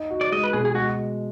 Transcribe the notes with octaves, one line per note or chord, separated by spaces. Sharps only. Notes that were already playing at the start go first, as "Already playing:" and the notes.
Already playing: D#4
F#4
D5
G#3 D#5
B4
B2 G#4
G#4
G#3 F#4